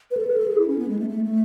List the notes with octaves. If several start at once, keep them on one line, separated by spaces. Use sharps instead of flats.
B4
A4
B4
A4
G#4
E4
C#4
B3
G#3
A3
A3
A3